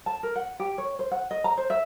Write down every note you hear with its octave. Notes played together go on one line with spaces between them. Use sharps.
A5
A#4
F#5
G4
C#5
C5
F#5
D#5
A#5
C5
E5